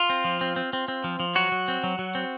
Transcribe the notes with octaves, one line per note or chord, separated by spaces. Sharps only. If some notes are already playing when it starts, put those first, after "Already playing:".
Already playing: F4
C4
F3
C4
C4
C4
C4
F3
F3
F#3 F#4
F#3
C4
F#3
F#3
C4